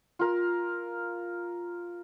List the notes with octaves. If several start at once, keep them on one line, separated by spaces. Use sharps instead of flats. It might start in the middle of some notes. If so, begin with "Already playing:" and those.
F4 A#4